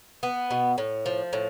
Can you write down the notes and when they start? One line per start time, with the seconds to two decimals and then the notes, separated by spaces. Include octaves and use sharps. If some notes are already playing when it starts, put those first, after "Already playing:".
0.23 B3
0.51 B2
0.78 A2
1.06 F3
1.33 A2